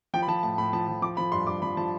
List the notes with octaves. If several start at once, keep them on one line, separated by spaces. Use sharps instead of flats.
F3 G5
B5
F3 A5
A2 A5
A2 B5
F3 A5
F3
F3 D6
F3 B5
G2 C6
G2 D6
F3 B5
F3 A5